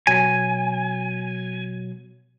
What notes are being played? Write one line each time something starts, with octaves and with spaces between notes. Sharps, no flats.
B2 F#3 G#5